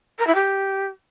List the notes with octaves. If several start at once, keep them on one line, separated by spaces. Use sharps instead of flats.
A#4
E4
G4